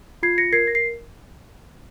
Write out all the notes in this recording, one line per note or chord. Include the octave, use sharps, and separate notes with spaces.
F4 G#6 C7
A#6 C#7
A#4 G#6 C7
A#6
C7